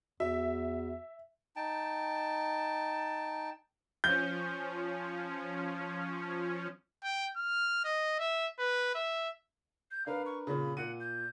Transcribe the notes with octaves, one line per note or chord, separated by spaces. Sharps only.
E2 F#4 E5
D#4 G5 A5
F3 C#4 G6
G5
F6
D#5
E5
B4
E5
G6
D4 A#4 B4 F5
C#6
A#2 C#3 B5
A#2 F#5 D#7
G6